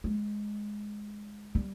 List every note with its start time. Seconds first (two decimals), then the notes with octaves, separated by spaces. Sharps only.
0.04 G#3
1.55 G3